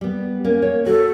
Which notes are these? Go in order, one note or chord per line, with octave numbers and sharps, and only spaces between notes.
G3 B3
A#3 C#4
C#5
F#4 A4